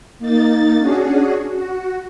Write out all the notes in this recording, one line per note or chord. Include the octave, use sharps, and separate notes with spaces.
A#3 D#4 A6
C#4 D4 F#4 G#4
F#4